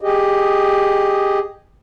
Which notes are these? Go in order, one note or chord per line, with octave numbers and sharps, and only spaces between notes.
G4 G#4 D#5